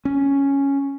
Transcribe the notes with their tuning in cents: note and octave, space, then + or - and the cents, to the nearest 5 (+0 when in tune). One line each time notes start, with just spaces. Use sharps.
C#4 +0